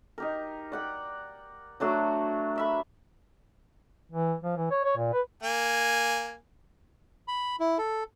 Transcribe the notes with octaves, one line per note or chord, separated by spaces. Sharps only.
D#4 G4 A#4
D5 F#5 G5
F#3 A3 D4 F#4
A#4 E5 B5
E3
F3
E3
C#5
C#5
A#2
B4
A#3 G#5
B5
E4
A4